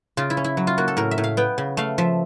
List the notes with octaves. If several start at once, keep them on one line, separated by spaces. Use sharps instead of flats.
C#3 F4
E4
C#4
E4
F#3
F4
A#3 F#4
A4
A2 A#4
E5
A2
F5
B3 G5
C#3
A3 F5
F3 E5